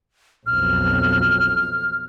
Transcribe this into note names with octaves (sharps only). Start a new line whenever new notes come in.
B1 F2 F6